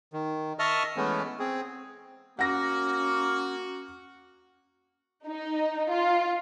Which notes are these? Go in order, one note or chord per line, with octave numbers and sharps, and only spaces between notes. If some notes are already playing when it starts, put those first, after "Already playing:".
D#3
D#5 E5 A5 C#6 D#6 F6
E3 G#3 A3 B3 C#4
C4 G#4
A#3 C#4 F#4 F#5 A#6
D#4
F4